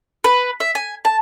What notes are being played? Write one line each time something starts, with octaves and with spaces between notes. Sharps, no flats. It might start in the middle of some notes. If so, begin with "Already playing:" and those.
B4
E5
G#5
A5